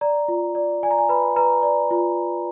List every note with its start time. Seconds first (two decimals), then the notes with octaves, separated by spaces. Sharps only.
0.01 D5 A#5
0.28 F4
0.55 D5
0.83 D5 G#5
0.91 A#5
0.98 G#5
1.09 B4 B5
1.36 B4 A#5
1.63 D5
1.91 F4